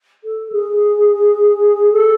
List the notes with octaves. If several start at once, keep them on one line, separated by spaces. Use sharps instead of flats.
A4
G#4
A4